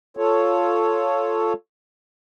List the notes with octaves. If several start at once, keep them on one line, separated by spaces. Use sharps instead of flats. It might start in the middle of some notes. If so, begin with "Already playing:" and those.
F4 A4 C#5